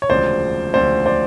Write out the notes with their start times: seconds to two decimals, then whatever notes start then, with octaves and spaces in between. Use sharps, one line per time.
0.02 C#5
0.10 E1 D2 C#3 F3 C5 D5
0.73 E1 D2 C#3 F3 C5 D5
1.06 C5 D5